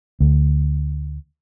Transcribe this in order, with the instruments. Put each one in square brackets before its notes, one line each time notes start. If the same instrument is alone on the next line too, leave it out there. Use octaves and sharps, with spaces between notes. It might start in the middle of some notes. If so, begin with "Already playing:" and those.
[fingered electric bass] D2